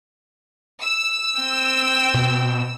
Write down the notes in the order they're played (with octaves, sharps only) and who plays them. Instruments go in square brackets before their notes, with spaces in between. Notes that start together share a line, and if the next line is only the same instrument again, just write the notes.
[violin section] E6
[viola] C4 G5
[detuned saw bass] B2